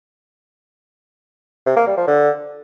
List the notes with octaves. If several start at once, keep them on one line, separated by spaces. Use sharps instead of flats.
C3
A#3
G3
F3
D3